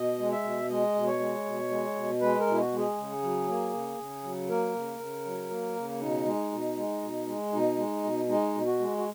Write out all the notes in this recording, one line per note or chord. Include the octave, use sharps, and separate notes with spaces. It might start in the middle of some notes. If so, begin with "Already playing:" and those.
Already playing: B2 D#5
G#3
E5
B2
G#3 D#5
B2
C#5
G#3
B2
G#3
B2
G#3 B4
A#4
B2 E4
F#4
G#3
G#4
C#3
F#3
A#3
C#3
C#3
F#3
A#3 A#4
C#3
C#3
F#3
A#3
C#3
B2 D#4
G#3
B2
G#3
B2
G#3
B2 D#4
G#3
B2
G#3 D#4
B2
F#4
G#3
F#4